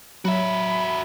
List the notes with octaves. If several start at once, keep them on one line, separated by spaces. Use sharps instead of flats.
F#3 F#4 E5 B5